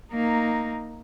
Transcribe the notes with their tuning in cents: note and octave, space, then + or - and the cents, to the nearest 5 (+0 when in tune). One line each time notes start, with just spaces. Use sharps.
A#3 -5 D#4 +0